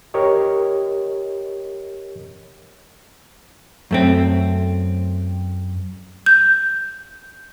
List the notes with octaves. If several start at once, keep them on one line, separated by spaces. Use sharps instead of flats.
G4 A#4 C#5 D#5
F#2 A3 C4
G6